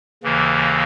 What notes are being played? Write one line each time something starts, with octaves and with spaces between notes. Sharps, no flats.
D#2 C#3 E3 A#3